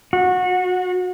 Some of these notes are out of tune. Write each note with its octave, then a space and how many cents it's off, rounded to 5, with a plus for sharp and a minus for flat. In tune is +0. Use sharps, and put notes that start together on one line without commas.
F#4 -25